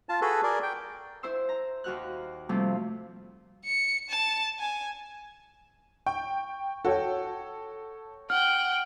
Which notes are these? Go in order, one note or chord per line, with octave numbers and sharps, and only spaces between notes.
F4 A5
F#4 G#4 A4 B4
G#4 A#4 D5
G5
E4 C5 E5 C6 E6
A#5
D#2 D#3 F#4 F6 F#6
C3 F3 G3 A3 A#3 C4
C#7
A5
G#5
G5 C#6
F#4 A4 C#5 G5
F#5 G5 F6